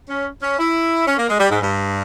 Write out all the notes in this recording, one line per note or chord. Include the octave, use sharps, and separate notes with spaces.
C#4
C#4
E4
C#4
A#3
G#3
G3
G#2
G2